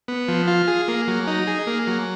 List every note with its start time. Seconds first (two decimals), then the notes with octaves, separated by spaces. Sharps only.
0.08 B3
0.28 F3
0.48 F4
0.68 G#4
0.88 A#3
1.08 F#3
1.27 D#4
1.47 G#4
1.67 A#3
1.87 F#3